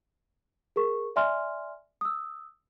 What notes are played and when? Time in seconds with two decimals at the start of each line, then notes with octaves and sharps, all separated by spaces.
0.76 G#4 A#4 C#6
1.16 D5 E5 G#5 C6 F6
2.01 D#6 E6